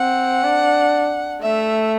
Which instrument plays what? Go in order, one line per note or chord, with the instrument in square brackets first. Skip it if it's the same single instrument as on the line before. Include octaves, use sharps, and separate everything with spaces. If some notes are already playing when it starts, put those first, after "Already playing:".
Already playing: [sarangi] C4 [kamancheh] F#5
[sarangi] D4
[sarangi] A3 [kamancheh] E5